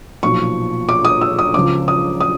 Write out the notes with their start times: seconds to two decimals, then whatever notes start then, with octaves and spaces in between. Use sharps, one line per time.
0.23 B1 A#2 F3 C#6
0.89 D6
1.05 D#6
1.21 E6
1.39 D#6
1.54 C#2 C#3 F3 D6
1.88 D#6
2.20 D#6